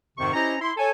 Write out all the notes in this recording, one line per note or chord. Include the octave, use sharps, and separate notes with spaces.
F2 G#2 C3 D#3 C5 C#6
C#4 E4 G4 C5 D#5 A#5
E4 C6
A4 C#5 G#5